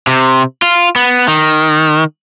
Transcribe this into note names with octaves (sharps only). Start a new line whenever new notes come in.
C3
F4
B3
D#3